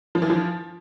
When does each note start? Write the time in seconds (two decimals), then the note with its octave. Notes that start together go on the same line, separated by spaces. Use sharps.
0.15 F3
0.22 E3
0.30 F3